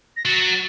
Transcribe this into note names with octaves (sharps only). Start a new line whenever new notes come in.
A#6
F#3 A6
A6
A6